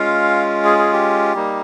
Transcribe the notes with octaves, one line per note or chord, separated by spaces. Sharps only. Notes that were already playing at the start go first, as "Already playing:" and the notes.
Already playing: G#3 C#4 F4 F5
G#4
G#4
G4
G3 A#3 D#4